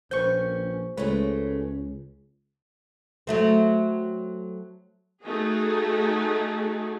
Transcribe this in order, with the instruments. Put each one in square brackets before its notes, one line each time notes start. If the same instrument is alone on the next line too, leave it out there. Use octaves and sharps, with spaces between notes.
[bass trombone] A#1 [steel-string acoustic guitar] D#2 A#3 C#4 [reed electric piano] B4 C#6 G6 [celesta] C5
[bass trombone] C#2 [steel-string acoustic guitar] G#3 A3 [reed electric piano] B4 C#5
[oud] F#3 A3 C4
[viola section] A3 D#4 F#4 G#4